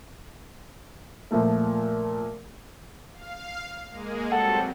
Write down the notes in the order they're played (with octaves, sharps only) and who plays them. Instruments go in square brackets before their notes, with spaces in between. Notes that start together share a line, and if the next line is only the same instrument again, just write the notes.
[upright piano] A#2 F3 A3 A#3
[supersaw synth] F5
G#3 A#3 G#4
[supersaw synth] F#3 G3 C4 [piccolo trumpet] A4 [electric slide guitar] F#5